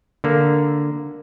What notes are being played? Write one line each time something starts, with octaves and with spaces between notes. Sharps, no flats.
D3 A#3